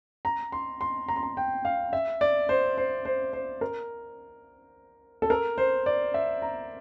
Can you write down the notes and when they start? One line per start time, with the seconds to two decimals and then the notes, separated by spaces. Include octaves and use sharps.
0.25 A#5
0.52 C6
0.81 C6
1.08 A#5
1.16 C6
1.23 A#5
1.37 G5
1.65 F5
1.93 E5
2.21 D5
2.49 C5
2.78 C5
3.05 C5
3.33 C5
3.61 A#4
5.22 A4
5.30 A#4
5.58 C5
5.86 D5
6.14 E5
6.42 A#5